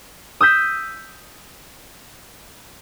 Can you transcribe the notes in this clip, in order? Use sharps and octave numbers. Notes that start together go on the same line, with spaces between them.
D#6 E6 G6 B6